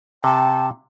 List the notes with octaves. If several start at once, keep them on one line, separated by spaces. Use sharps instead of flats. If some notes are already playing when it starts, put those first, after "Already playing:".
C3 G5 A5